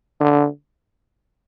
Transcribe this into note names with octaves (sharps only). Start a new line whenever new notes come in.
D3